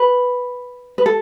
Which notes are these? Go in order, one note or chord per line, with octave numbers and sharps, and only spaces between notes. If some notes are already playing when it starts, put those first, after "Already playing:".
Already playing: B4
B4
A4